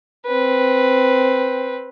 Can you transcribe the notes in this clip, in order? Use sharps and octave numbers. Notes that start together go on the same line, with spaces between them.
C4 B4